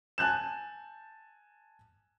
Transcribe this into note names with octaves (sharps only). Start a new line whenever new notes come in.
G#5 A5 F#6 G6 E7